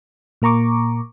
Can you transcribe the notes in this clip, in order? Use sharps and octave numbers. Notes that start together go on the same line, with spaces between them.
A#2 A#3 A#5 C#6 D6